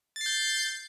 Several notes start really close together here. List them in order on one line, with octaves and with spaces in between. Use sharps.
A6 C7 G6